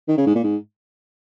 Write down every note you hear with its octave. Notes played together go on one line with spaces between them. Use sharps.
D#3
C#3
G#2
A#2
G#2